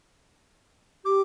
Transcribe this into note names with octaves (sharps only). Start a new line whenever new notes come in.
G4 D6